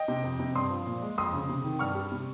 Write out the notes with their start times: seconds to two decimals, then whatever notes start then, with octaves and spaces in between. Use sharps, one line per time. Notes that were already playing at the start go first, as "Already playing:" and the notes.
Already playing: D#5 G5
0.08 C3
0.24 F2
0.40 C3
0.55 G2 C6 D#6
0.70 F3
0.86 A#2
1.02 G#3
1.18 F2 C6 D#6
1.33 C#3
1.49 C3
1.64 D#3
1.79 G2 C#6 F6
1.95 G3
2.12 C3